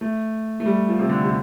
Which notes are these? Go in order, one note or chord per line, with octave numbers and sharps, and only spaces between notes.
A3
A3
G3
F3
C3
D3
C3